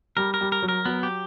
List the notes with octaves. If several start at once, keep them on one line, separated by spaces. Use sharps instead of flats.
G3 A#4
A#4
G3
A#4
F#3
A#4
F#3 B3
G4